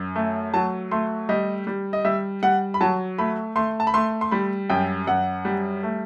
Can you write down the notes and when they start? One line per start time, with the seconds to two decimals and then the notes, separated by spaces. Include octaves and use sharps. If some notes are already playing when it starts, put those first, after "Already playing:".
Already playing: F#2
0.16 A3
0.54 F#3 A5
0.91 A3 C6
1.29 G3 D#5
1.67 G3
1.93 D#5
2.05 G3 E5
2.43 G3 F#5
2.74 B5
2.81 F#3 A5
3.18 A3 B5
3.56 A3 C6
3.80 A5
3.87 B5
3.94 A3 C6
4.21 C6
4.31 G3 B5
4.70 F#2 G5
5.07 F#2 F#5
5.45 G3
5.83 A3